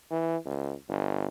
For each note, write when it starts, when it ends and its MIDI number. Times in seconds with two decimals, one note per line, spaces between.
0.11 0.37 52
0.46 0.73 37
0.89 1.27 31